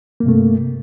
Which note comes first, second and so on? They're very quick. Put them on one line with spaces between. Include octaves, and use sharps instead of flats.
A#3 G2 C3 A3